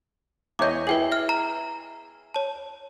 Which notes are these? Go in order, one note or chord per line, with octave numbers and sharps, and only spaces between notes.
E2 C#5 D#5 D6 G6
E4 G#4 B4 G5 F#7
E5 F6
A#5
C#5 A5